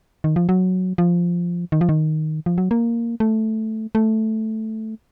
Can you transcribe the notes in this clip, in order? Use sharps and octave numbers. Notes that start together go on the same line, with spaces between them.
D#3
F3
F#3
F3
D#3
F3
D#3
F3
F#3
A#3
A3
A3